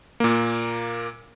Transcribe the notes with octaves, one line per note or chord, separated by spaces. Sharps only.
A#2 A#3